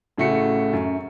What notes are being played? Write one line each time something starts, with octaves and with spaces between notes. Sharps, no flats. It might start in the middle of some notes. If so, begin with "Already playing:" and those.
A1 C#3 A3 F#4 C#7
F#2